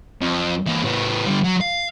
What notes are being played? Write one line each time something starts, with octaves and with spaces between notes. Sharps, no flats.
F2
E3 A#3
A2 B3
D3 G3
F#3
F5